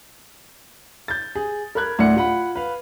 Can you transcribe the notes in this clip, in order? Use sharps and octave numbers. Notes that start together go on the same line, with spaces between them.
G6 A6
G#4
A#4 B5 F#6 G#6
D2 A2 D5 F#5 C#7
F4 F#5 B5
B4 F5